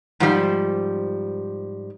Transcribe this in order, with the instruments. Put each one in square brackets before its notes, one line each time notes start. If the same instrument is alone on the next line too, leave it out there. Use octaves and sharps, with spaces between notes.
[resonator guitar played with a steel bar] G#2 F3 G3